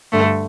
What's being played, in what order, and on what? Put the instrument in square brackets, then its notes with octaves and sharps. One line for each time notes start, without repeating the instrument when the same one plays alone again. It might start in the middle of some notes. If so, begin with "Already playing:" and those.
[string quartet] G2 D3 A3